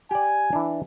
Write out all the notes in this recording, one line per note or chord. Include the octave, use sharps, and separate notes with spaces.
G4 D5 G#5
E3 D4